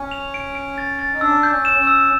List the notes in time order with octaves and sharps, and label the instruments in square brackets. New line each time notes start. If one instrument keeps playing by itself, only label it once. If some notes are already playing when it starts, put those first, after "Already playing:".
Already playing: [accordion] C#4
[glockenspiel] F7
D7
D7
A6
A6
[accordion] D#4
[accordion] D4 [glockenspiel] E6
[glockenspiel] G6
[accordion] C#4
[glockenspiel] E7
[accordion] C#4
[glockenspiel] E6